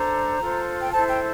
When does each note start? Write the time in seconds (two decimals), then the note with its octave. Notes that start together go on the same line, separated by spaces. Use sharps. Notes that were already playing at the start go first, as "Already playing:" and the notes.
Already playing: D4 A4 C5 A#5
0.39 F4 A4 C5
0.80 G5
0.92 E4 A4 C5 A5
1.08 G5